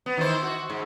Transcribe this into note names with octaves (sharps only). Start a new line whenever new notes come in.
B3
D#3 E3 C5
F#4
G#2